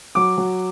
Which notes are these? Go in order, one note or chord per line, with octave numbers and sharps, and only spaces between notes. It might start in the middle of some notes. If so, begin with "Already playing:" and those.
F#3 D6
F#3